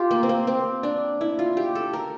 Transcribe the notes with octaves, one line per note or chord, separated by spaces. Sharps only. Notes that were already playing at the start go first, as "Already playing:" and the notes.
Already playing: F4 G4
A#3
C4
A#3
C4
D4
E4
F4
G4
A4
A#4